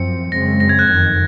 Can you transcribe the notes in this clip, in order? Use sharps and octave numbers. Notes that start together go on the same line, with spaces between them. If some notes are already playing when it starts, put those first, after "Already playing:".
Already playing: F#2 F3 C4 C#7
F#2 C#3 G#3 C4 A#6
A#6
G#6
F#6
F#1 F2 D#3 G#6